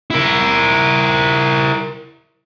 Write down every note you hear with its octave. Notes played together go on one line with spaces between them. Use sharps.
E4 A#4